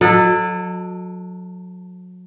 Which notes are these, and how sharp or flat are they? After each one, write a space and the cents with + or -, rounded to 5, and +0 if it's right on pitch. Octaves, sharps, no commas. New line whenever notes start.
F#3 -30 A4 +0 D#5 -25